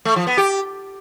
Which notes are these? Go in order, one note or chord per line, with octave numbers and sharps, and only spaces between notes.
A3
F3
B3
G4